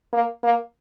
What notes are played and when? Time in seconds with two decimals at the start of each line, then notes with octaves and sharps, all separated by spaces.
0.13 A#3
0.44 A#3